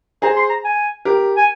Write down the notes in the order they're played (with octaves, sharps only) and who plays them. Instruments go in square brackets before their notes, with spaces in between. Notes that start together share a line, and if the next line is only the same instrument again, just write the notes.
[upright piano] G#4 C5 [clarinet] A#5
[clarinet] C6
A#5
G#5
[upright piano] G4 A#4
[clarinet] G#5